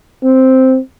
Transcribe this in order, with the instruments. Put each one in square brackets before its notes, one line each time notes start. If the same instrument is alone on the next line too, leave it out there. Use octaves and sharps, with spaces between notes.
[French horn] C4